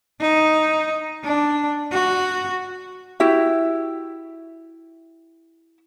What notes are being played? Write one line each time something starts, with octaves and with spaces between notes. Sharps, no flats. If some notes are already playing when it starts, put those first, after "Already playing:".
D#4
D4
F#4
E4 F#4 G4 E5